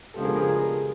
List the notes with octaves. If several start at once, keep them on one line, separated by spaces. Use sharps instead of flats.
C#3 F3 G#3 B3 D4 G4 A4
G#4 A#4
G#4 A#4